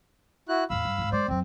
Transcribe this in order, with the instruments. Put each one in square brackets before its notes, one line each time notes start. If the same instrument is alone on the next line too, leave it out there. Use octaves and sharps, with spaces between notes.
[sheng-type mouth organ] E4 F#4 F#6
[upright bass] E2 A2 [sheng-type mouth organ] F5 B5 E6
[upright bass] G2
E2 G#2
[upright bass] G#3 [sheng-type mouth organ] C5 D5
[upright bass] F2 F#3 [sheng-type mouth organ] C4